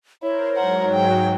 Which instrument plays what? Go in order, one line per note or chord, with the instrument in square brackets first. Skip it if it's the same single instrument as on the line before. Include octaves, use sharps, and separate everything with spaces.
[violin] E4 [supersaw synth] A#4 C5 [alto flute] C#5
[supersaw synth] G#2 F#3 [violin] A#4 F#5
[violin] G5